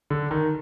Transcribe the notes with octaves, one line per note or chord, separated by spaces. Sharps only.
D3
D#3